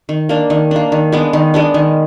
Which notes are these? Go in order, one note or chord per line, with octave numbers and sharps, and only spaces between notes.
D#3
A#3 D4
D#3
A#3 D4
D#3
G#3 B3 D4
D#3
G#3 B3 D4
D#3